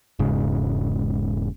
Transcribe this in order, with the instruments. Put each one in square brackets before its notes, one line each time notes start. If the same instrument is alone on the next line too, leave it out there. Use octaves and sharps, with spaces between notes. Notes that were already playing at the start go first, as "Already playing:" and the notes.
[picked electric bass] E1 G#2 C#3